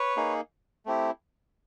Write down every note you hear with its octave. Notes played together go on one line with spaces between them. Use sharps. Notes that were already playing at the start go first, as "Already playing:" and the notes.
Already playing: B4 C#5
A#3 D#4 G#4
A3 C4 E4 G4